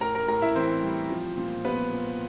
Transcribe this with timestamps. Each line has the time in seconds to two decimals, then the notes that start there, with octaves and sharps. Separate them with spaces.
0.01 A2 A#4 A#5
0.15 A#4 A#5
0.28 A2 A#4 A#5
0.42 E4 E5
0.55 E3 C4 C5
0.83 G3
1.10 F3
1.38 A#2
1.65 F3 B3 B4
1.93 A#2